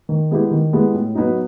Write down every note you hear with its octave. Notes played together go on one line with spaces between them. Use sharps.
D#3
G#3 B3 E4 G4
D#3
G#3 B3 E4 G4
A2
F#3 B3 D#4